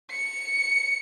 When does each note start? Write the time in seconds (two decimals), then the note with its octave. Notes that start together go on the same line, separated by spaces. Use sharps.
0.11 C#7